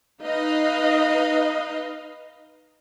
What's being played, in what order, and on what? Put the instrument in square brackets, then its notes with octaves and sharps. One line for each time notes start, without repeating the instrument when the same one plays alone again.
[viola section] D#4 B4 D#5 F5